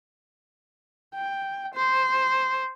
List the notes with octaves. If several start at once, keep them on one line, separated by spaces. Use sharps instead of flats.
G5
C5